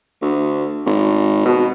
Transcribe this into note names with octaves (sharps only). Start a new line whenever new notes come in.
D2
G#1
B2